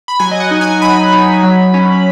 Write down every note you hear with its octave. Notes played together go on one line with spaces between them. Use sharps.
B5
F#3 G#5
D#5
F#5
D#4
G#5
F#3 B5
D#4
F#3
C#4